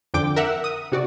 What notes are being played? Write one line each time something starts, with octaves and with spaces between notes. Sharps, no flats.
F2 D3 G5 D6
A#4 E5 F#5
D#6
C3 F#4 D5